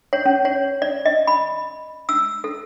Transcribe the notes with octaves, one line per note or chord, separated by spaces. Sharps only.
C#5
C#4
C#5
D5
D#5
B5
E6
A4